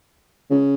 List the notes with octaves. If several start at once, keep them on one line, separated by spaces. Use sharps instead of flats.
C#3